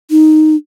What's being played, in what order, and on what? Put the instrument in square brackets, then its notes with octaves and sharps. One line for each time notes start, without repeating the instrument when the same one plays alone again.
[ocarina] D#4